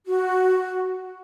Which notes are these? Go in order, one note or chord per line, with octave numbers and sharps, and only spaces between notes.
F#4